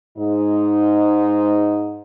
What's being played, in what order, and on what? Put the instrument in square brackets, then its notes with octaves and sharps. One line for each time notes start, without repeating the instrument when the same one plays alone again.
[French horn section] G#2 D#4